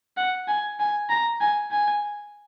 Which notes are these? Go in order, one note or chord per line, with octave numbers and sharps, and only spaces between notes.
F#5
G#5
G#5
A#5
G#5
G#5